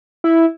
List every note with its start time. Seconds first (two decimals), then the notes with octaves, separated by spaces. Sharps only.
0.24 E4